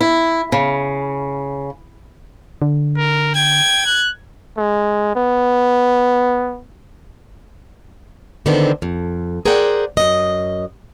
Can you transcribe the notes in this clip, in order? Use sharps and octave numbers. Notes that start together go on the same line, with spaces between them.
E4
C#3
D3
A#4
G5 G#6
F#6
G#3
B3
D3 D#3 F3 B3 C4 D4
F2
G#4 A#4 C5 D5 F#5 G5
F#2 D#5